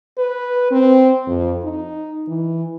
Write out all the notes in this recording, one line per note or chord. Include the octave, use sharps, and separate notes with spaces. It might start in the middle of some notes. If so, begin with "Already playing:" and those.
B4
C4
F2
D#4
E3